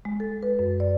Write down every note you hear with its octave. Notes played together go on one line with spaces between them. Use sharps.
G#3
A4
B4
F#2
D5